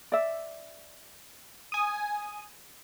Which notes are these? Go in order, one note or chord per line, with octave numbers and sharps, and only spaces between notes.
D5 E5
G#5 D#6